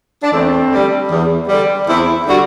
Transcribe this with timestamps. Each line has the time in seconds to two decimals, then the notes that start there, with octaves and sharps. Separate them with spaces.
0.23 D4
0.32 E2 A3 C4
0.71 D3 G3
1.10 E2
1.48 D3 G3
1.87 E2 C4 E4
2.27 D3 G3 D4 F#4